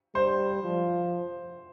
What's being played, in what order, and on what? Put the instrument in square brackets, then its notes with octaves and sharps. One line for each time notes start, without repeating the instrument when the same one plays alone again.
[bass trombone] G3 [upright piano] C5
[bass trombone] F3